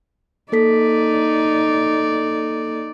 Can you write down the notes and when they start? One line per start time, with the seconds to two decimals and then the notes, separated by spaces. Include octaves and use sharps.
0.52 A#3 D#4 A4 D5 B6